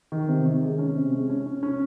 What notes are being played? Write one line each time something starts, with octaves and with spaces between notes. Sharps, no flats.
D#3
C3
D#3
G#3
C#4
C3
G#3
C#4
C#4
C#4